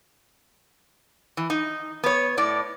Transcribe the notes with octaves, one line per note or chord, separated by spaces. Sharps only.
E3
D#4
B3 C#5
A2 D5